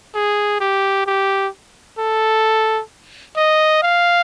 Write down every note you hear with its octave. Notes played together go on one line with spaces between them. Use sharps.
G#4
G4
G4
A4
D#5
F5